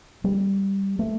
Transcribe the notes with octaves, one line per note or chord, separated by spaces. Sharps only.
G3
A3